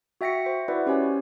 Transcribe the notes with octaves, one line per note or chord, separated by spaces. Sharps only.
F#4 E5 G5 A#6 B6 C#7
C5 E5
E4 F#4 B4 D5 E5 F#5
C#4 G4 C5 C#5 G#5